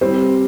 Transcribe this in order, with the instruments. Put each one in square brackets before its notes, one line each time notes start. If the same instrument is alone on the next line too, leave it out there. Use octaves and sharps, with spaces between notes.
[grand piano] G3 [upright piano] C4